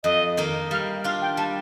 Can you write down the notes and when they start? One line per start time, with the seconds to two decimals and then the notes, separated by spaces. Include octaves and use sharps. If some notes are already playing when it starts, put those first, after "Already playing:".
0.04 F2 D#5
0.37 D#3 A#3 D#4 A#4
0.71 G3 F5
1.04 D4 F4 F5
1.21 G5
1.37 G3 A5